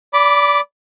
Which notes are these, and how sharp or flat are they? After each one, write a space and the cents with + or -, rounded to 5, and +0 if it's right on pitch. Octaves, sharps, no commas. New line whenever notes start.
D5 -25 B5 +0 D6 +0